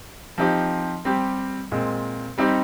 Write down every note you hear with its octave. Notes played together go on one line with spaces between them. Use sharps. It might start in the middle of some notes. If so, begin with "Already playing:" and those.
F3 C4 D#4 G4
G3 C4 G4
A#2 G#3 C4
G3 C4 D#4 G4